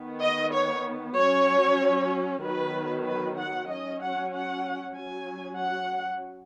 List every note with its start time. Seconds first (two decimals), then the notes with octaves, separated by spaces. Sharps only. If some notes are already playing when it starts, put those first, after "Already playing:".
Already playing: D#3 B3
0.22 D#5
0.53 C#5
1.16 F#3 C#4 C#5
2.43 D#3 F#3 B3 B4
3.06 B4
3.38 F#5
3.70 F#3 C#4 D#5
4.01 F#5
4.33 F#5
4.96 F#3 C#4 G#5
5.59 F#5